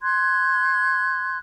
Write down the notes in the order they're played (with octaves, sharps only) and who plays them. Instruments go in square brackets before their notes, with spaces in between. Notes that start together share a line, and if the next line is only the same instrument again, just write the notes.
[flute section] C6 F#6 G#6